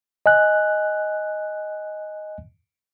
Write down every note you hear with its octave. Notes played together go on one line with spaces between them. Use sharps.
D#5 G#5 F#6